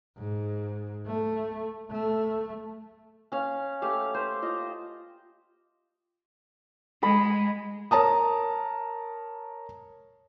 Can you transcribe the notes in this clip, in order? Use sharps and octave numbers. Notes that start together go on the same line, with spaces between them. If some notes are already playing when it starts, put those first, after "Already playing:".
G#2
A3
A3
C#4 F5
A3 G4 F5
C5
F4 D#5
G#3 B5 D#6
A#4 C#5 A5 A#5 D#6